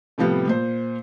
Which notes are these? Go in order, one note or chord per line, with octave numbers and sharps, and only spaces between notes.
A2 C3 F3 G3 B3
A#2 C5